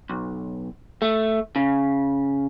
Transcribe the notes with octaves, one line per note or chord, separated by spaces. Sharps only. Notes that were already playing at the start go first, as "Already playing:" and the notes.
B1
A3
C#3